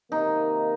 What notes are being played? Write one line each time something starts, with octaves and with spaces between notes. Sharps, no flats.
C3 D#3 A#3 D#4